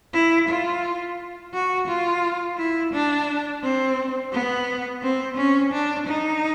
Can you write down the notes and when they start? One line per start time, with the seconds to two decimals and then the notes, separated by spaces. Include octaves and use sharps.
0.13 E4
0.48 F4
1.54 F#4
1.88 F4
2.58 E4
2.93 D4
3.63 C4
4.32 B3
5.03 C4
5.37 C#4
5.73 D4
6.07 D#4